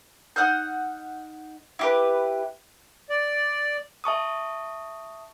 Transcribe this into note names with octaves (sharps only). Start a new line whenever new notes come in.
D#4 F#5 F6 G6
E4 G4 B4
D5
E5 A5 C#6 D#6